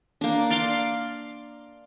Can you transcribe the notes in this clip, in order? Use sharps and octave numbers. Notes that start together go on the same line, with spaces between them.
A#3 D4
D5 F5 C6 D6